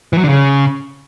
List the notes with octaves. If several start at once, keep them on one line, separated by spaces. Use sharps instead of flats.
E3
F#3
D3
C#3